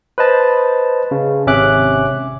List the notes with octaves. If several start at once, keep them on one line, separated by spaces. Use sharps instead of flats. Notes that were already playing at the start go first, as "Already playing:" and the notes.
B4 C5 D#5 A5
C#3
G#1 C3 C#4 E5 D6 F#6